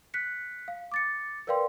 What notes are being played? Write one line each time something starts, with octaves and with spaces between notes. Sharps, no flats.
F#6 B6 C#7
F5
D6 A6 C#7
A#4 B4 D5 F5 G5 C6